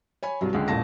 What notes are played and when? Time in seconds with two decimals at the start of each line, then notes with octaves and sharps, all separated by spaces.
0.23 C#5 G#5 B5
0.41 C2 G2 F#3
0.53 C#2 D3 G#3
0.68 E1 A1 A#2 A5 A#6